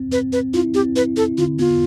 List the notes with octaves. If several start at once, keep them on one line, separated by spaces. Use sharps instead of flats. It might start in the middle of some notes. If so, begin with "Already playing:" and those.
Already playing: C4
C4 B4
C4 B4
E4 F4
C4 G4
E4 B4
E4 A4
D3 F4
B3 F4